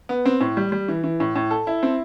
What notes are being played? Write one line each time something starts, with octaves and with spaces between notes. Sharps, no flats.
B3
C4
A2
G3
G3
E3
E3
A2
A2
A4
E4
C4